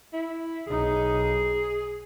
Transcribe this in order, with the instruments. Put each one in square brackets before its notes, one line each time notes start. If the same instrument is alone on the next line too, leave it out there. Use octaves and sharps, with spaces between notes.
[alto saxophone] E4
[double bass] B1 D#4 [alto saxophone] G#4